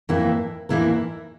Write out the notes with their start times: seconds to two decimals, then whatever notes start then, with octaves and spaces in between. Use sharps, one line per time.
0.09 F2 E3 A#3 E4 A#4
0.69 F2 E3 A#3 E4 A#4